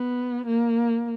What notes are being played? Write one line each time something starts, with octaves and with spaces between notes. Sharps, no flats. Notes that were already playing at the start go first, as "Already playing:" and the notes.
Already playing: B3
A#3